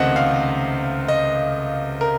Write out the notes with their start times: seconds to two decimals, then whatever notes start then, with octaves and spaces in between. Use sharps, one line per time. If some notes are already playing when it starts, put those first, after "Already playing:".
Already playing: C#2 C3 D#3 A3 C5 D#5 F#5
0.16 F5
1.08 D#5
2.01 A#4